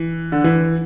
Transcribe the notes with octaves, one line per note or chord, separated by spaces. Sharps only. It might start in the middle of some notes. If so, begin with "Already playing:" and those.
Already playing: E3
D3
E3